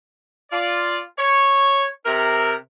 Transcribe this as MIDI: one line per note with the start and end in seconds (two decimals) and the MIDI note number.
0.52 1.00 65
0.52 1.00 74
1.18 1.85 73
2.06 2.54 48
2.06 2.54 70